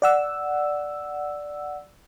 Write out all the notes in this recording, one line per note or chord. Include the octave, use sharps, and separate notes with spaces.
D5 F#5 E6